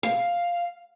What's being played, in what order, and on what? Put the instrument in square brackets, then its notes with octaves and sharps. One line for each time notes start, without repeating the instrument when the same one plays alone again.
[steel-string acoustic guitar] F5